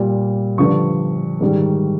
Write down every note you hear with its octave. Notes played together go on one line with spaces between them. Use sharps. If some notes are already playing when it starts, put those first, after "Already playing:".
Already playing: A#2 G3
G2 D3 F3 C#6
G#2 D#3 G3